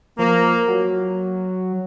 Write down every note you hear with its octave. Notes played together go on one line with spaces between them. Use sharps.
F3 A#3
F#3